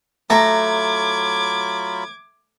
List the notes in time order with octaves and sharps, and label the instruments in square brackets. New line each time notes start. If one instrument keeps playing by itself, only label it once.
[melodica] F#3 F4 B5 [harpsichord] A3 [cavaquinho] A#5 [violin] D6 G#6